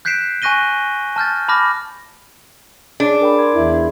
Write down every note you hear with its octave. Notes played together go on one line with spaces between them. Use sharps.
F#6 G6 B6 C7 D7 E7
G#5 C#6 F#6 A#6 D#7 G7
A5 F6 G6 A6
A5 B5 D6 F6 A#6
D4 G#4 C#5
A#4 G5 B5
C6 G#6
E2 E4